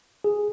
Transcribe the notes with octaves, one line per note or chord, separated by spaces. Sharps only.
G#4